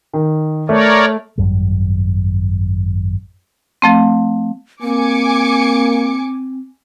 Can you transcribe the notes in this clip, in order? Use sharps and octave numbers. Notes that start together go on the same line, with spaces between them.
D#3
A3 A#4 C#5 D5
G#1 F#2 F#3 G3
F3 A3 C4
A#3 C4 G#5 D6 C#7